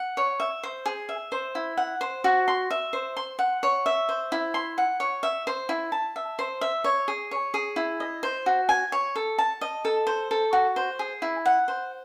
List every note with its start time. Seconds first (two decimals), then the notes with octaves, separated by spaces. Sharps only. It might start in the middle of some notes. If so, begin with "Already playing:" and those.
Already playing: F#5
0.17 C#5
0.40 E5
0.63 C5
0.86 G#4
1.09 E5
1.32 C5
1.55 E4
1.77 F#5
2.01 C5
2.24 F#4
2.48 C6
2.71 E5
2.93 C5
3.17 C6
3.39 F#5
3.63 C#5
3.86 E5
4.09 C5
4.32 E4
4.54 C6
4.78 F#5
5.00 C#5
5.23 E5
5.47 C5
5.69 E4
5.92 A5
6.16 E5
6.39 C5
6.61 E5
6.84 C#5
7.08 G#4
7.31 C#5
7.54 G#4
7.76 E4
8.00 D#5
8.23 C5
8.46 F#4
8.69 G#5
8.92 C#5
9.16 A4
9.38 A5
9.61 D#5
9.85 A4
10.07 C5
10.31 A4
10.53 F#4
10.76 C5
10.99 G#4
11.22 E4
11.46 F#5
11.68 C5